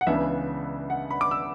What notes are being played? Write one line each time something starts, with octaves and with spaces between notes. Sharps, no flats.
F#5
C#2 C#3 E3 B3 D4 E5
F#5
B5
D6
E6